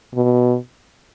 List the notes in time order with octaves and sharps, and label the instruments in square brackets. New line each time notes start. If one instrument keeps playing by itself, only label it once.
[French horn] B2